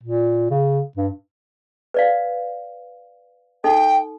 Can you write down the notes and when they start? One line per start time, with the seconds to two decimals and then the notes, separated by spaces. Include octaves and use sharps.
0.03 A#2
0.51 C#3
0.97 G2
1.94 B4 D5 F5
3.64 D#4 A4 G5